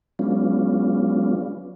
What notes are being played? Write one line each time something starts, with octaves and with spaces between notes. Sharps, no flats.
F#3 G#3 B3 C#4 D4 F4